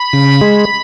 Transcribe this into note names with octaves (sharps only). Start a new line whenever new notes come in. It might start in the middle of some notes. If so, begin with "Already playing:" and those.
Already playing: B5
C#3
G#3